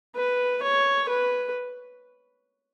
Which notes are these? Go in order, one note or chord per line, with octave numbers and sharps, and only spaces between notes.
B4
C#5
B4